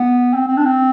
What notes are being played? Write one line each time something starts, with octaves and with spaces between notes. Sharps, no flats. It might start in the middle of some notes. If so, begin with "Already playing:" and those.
Already playing: B3
C4
C4
D4
C4